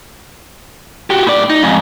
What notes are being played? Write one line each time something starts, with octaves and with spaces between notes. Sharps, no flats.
F#4 G4
A2 D5
D#4
F2 G#2